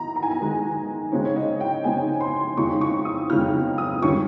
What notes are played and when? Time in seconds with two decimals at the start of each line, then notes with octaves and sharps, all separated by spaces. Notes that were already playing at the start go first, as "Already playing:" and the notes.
Already playing: D#3 D#4 A#5
0.16 A#5
0.23 G#5
0.31 A#5
0.40 D#3 G#3 D#4
1.12 C#3 G#3 C4 D#4 C#5
1.25 C#5
1.36 D#5
1.60 G5
1.84 C#3 G#3 C4 D#4 G#5
2.21 C6
2.57 F2 C#3 G#3 D#4 C#6
2.81 C#6
3.05 D#6
3.30 F2 C#3 G#3 D#4 F6
3.78 D#6
4.02 F2 D#3 G3 C#4 C#6